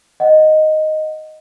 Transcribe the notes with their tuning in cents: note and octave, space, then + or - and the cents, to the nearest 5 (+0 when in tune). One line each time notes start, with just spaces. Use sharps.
D#5 +0 F#5 +0